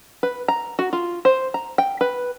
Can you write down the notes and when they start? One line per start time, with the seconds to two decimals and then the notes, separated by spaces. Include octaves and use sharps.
0.23 B4
0.48 A#5
0.79 F#4
0.93 F4
1.25 C5
1.54 A#5
1.78 G5
2.01 B4